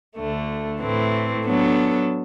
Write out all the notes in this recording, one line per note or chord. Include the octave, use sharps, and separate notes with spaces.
D2 D3 A3
A2 E3 A3 C4
F#3 B3 D4 A4